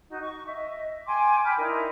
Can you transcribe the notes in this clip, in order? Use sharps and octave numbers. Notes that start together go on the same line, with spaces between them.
D#4 F#4
C#6
D#5 E5
G5 G#5 C6 D6
G5 B5 F6 G6
D#4 E4 A#4 D5